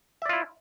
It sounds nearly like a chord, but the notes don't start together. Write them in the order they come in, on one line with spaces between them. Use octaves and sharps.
E5 D5 F4 E4